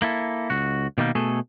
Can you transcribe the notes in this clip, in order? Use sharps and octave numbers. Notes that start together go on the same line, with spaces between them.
A#3 E4 A4
C#2 F#4
B2 D#3 G3 A3 A#3
B2 A3 G#4 A4